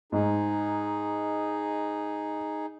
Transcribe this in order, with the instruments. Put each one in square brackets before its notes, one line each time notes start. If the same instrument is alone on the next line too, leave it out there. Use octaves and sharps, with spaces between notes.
[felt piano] G#2 [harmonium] D#4 G#4